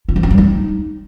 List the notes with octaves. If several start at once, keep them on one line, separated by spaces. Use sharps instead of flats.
F4
F3
D4
G3
D#4